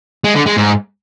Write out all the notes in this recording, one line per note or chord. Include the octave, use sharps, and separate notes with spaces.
G#3
D3
G#3
G#2